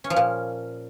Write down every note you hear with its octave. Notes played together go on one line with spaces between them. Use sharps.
C#4
F3
A#2